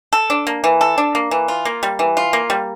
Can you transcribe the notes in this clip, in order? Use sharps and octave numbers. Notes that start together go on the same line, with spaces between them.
A4
D4
A#3
E3
A4
D4
A#3
E3
F4
A#3
G3
E3
F4
A#3
G3